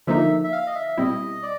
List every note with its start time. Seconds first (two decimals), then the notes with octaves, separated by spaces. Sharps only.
0.07 D3 F3 A#3 D#4 E5
0.44 E5
0.52 F5
0.67 D#5
0.75 E5
0.98 B2 G3 C4 E4 D#5
1.43 D5